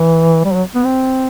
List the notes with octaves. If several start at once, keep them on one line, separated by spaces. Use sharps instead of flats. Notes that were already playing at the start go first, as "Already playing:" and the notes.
Already playing: E3
G3
F#3
B3
C4